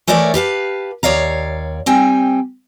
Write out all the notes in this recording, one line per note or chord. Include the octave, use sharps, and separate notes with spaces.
E3 A3 A#4 C#5 D5 E5
G4 B4 F5 A5
D#2 C#5 D5 F5 A#5
G3 C4 G5 G#5